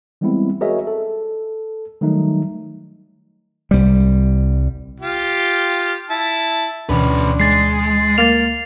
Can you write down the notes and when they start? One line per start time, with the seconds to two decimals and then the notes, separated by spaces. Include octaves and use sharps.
0.21 E3 G3 G#3 B3 C4 E4
0.61 F#4 G#4 A#4 C#5 D#5 E5
0.87 A4
2.01 D#3 F#3 G3 A3 D#4
3.71 C2 G3
5.00 F4 G4
6.10 E4 A5
6.89 D2 B2 E3 C#4 D4 B4
7.40 G#3 A6 C7
8.18 A#3 A6 F7